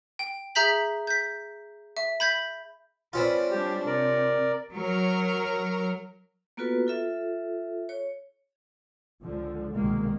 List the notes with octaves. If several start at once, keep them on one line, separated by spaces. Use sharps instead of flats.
G5
G#4 E5 A#5 G6 B6 F#7
G6 B6
E5
B5 G6 G#6 B6
C4 C#4 F4 B4 D5
G3 D4 G4
C3 A#4 D5
F#3 A#4
A#3 B3 F4 F#4 A4 B4
F4 A4 E5
C#5
C#2 D3 F3
C2 B2 D#3 G#3 A#3